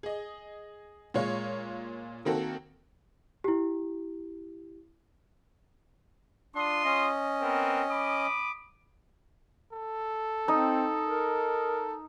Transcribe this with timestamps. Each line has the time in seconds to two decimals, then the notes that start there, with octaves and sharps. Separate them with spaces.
0.03 G#4 D#5
1.14 A#2 G#3 C#5 F5
2.25 D#3 A#3 C4 F#4 A4
3.44 E4 G4
6.55 D4 F4 C6 D#6
6.85 C#4 D#5
7.41 B3 C4 A#4
7.90 B5 D6 D#6
9.72 A4
10.48 C4 D#4
11.05 A#4